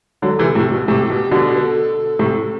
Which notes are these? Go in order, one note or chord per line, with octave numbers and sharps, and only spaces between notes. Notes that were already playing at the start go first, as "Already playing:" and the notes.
D3 F#3 A4
C3 E3
A2 C3
B2
A2 C3 G4
B2
B2 D3
B4
A4
A2 C3